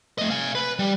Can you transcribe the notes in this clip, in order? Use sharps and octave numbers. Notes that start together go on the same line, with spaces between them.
A3 D#5
F5 G#5
B4
G3